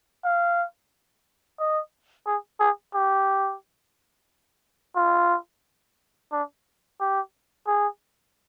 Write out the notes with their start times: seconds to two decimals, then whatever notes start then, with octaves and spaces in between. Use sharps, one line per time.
0.24 F5
1.60 D#5
2.26 G#4
2.60 G#4
2.94 G4
4.96 F4
6.32 D4
7.00 G4
7.67 G#4